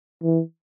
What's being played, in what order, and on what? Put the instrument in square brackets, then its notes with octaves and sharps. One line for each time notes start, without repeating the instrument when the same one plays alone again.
[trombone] E3